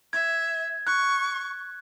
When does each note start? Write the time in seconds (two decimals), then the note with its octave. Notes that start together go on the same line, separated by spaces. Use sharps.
0.13 E5 G#6
0.87 C#6 F#6